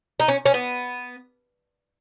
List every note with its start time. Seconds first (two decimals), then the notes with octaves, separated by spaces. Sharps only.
0.20 D#4
0.28 C#4
0.45 C#4
0.54 B3